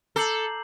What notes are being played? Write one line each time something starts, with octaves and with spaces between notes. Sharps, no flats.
A4 A#5 D6 G6 C7 F#7